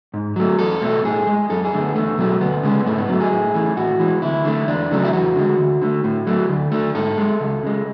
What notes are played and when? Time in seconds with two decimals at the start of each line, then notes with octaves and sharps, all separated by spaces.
0.14 G#2
0.36 F#3 A3
0.59 E2 A4
0.82 B2 A3
1.05 A2 G#4
1.27 G#3
1.50 F#2 A4
1.65 G#4
1.73 D3 A3
1.80 B3
1.96 E2 A3
2.18 B2 F#3 A3
2.41 D2 B3
2.63 C#3 G#3
2.86 G#2 A3
2.98 B3
3.09 F#3 C#4
3.13 A3
3.21 G#4
3.31 A2
3.54 E3 A3
3.77 A2 F#4
4.00 E3 G#3
4.22 D2 E4
4.45 D3 A3
4.68 E2 D4
4.91 C#3 F#3 A3 D4
5.04 E4
5.13 E2 F#4
5.36 D3 G#3
5.59 D2
5.82 D3 A3
6.04 A2
6.27 F#3 A3
6.49 D2
6.72 D3 A3
6.95 G#2 A4
7.18 G#3
7.40 C#2
7.63 C#3 G#3